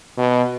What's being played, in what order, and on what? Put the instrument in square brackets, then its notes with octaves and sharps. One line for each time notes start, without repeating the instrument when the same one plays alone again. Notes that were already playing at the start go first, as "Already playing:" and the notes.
[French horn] B2